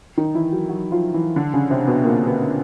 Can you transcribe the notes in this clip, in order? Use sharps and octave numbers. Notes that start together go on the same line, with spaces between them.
D#3 D#4
E3 E4
F#3 F#4
F#3 F#4
F3 F4
E3 E4
D3 D4
C#3 C#4
C3 C4
B2 B3
A#2 A#3
B2 B3